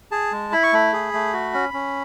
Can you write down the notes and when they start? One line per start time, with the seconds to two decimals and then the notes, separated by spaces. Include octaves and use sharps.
0.11 G#4 A5
0.32 G#3
0.52 E4 B5
0.63 C#6
0.73 A3 B5
0.93 G#4
1.14 A3
1.33 F#4
1.54 C#4
1.74 C#4